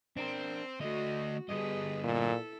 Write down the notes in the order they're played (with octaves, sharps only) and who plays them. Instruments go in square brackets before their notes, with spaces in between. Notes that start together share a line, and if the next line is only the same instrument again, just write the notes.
[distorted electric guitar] C4 [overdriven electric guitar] D4 A#4
[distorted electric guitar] D3 A3 [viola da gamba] F#4 [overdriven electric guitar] D#5
[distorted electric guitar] G2 D3 [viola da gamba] G4 G#4 B4 [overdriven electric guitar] D#5
[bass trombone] A#2 [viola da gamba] E4 A4